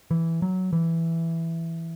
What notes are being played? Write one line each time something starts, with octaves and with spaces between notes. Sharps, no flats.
E3
F#3
E3